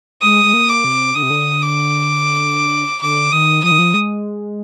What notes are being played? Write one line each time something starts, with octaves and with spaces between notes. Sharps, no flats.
G#3 D#6
G#3
A#3
D6
C3
D3 D#6
C3
D3
D6
D3 D6
D#3 D#6
F3 D#6
D#3
F3
G#3